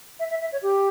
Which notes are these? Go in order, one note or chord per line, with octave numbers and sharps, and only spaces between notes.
E5
E5
E5
C#5
G4